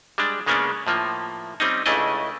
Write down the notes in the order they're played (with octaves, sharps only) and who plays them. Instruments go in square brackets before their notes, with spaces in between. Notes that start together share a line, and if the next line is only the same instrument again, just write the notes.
[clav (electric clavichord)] G3 G#3 D4
C#3 G#3 A#3 B3 C#4 D4
A2 F3 A#3
G3 C4 C#4 D#4
C#2 C#3 A3 D4 E4 D#5